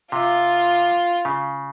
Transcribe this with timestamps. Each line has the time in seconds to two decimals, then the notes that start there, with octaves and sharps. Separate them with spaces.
0.12 C3 F4
1.25 C#3